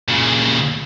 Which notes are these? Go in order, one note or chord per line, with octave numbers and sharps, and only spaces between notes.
A#2 C#3